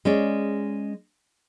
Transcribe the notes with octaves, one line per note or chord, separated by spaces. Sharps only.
G#3 C#4 D5